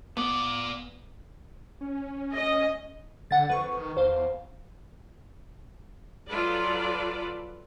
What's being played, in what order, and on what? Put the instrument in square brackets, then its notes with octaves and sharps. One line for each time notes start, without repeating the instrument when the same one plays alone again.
[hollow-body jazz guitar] B3 [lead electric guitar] F4 D5
[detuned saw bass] C#4
[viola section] D#5
[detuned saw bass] D3 [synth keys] F#5 A6
[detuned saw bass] F2 [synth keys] B4 C#6
[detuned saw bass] D#3
[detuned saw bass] E2 [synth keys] C5 F5
[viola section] F#3 F4 A4 B4 D5